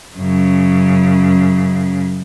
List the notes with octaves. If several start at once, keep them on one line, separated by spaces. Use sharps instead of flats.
F#2 C#3